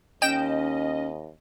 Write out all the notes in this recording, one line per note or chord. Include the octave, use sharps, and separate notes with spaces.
D#2 C#4 D#5 G5 G6 E7